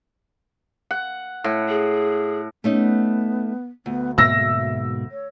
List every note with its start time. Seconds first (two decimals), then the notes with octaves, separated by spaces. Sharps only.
0.91 F#5
1.44 A2
1.69 G#4
2.64 A3 B3 C#4 D#4
3.86 D2 B3
4.18 G#2 B2 A#3 E5 E6 A#6
5.11 C#5